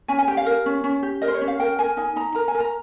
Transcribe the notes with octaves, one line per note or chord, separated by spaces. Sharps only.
C#4 G#5
G#5
G4 G5
F5
A#4
C#4
C#4
G4
A#4 D#5
C5
C#5
C#4
F5
A#4 G5
A#4 G#5
D#4 G#5
D#4 A#5
A#4 A#5
G#5
A#4
A#5